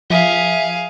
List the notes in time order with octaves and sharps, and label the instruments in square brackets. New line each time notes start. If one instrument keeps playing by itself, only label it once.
[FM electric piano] F3 [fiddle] G#4 F5 [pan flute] E5